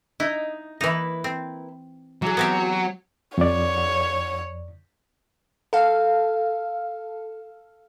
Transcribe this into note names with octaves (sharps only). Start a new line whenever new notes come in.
D#4 E4
E3 A#3 D#4 E4 B4
C4
E3 F#3 G#4
B3 C4 G4
F2 C#5 D5
A4 F5